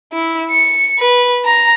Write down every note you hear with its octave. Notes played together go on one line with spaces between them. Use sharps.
E4
C#7
B4
A#5